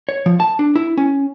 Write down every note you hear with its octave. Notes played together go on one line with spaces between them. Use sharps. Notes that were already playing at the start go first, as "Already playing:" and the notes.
C#5
F3
A5
D4
E4
C#4